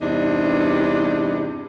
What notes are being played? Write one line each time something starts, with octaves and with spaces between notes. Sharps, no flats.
E2 G2 C3 D4 D#4